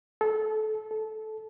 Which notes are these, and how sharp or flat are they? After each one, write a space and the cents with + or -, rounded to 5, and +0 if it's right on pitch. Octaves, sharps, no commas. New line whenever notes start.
A4 -25
A4 -15